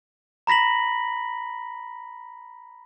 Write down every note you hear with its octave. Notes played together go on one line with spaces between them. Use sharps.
A#5 B5 A#6 B6 F#7